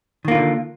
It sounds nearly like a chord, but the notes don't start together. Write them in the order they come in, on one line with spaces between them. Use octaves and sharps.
D#3 A#3 F4 D3